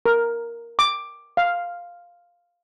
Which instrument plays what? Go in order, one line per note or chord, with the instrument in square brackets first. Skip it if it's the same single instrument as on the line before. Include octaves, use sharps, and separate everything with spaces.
[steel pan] A#4
D6
F5